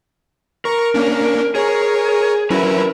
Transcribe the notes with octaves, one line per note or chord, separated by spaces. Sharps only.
A#4 A#5 C#6
A#3 C#4 D4
G#4 A#4 C#5
F#3 C#4 E4 A#4 B4